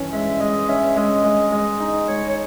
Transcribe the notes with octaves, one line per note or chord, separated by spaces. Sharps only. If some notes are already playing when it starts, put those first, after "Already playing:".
Already playing: G2 E3 C#4
G#3 E5
G#3 D#5
C#4 E5
G#3 D#5
G#3
G#3 D#5
D#4
G#3 C#5
C#5